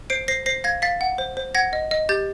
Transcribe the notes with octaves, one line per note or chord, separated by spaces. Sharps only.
C5 C7 D7
C5 A#6 C7
C5 A#6 C7
F5 G#6 A#6
F5 A6 B6
F#5
C5
C5
F#5 G#6 A#6
D#5
D#5
G4 G6 A6